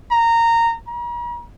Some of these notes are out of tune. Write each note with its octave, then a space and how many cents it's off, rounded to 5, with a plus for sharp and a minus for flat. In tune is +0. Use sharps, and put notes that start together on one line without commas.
A#5 -15
A#5 +45